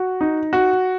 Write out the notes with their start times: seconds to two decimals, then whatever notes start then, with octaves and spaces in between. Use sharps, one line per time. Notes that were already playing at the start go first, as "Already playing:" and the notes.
Already playing: F#4
0.21 D#4
0.53 F#4